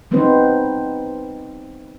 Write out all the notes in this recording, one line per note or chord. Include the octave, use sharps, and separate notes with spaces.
G3 B3 C4 D#4 B4 C5